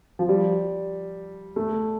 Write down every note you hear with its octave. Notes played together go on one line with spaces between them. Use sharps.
F3
G3
A3